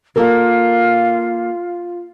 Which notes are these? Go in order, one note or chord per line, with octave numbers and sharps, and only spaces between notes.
A#3 F4 A4 A#4